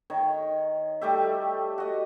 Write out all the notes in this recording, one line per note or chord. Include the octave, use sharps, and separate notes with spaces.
D#3 C#5
G3 A3 G4 E5
F#4 D#5